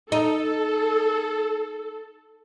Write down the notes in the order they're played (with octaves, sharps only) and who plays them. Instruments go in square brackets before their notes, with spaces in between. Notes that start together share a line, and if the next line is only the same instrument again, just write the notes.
[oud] D#4 [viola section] A4